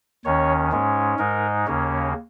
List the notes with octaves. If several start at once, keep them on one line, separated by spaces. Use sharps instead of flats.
D#2 D#3 C#4 C#5
G#2 G#3 C#4
G#2 G#3 D#4 A#4
D#2 C#3 A#3 C#4